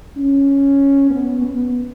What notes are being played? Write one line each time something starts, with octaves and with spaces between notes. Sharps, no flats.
C#4
B3
B3